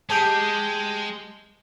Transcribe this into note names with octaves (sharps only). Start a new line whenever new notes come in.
G#3 C4 G4 G#4 A5 G6